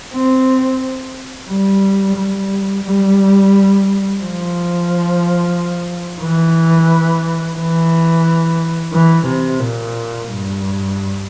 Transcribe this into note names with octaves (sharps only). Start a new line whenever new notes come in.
C4
G3
G3
G3
F3
E3
E3
E3
C3
A#2
G2